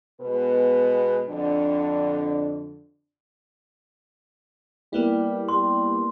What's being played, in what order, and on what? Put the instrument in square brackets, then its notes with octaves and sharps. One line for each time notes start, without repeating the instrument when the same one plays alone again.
[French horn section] B2 G#3 B3 B4
F2 D3 D4
[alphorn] G3 [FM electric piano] A#3 B3 E4
[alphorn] G3 [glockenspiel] C6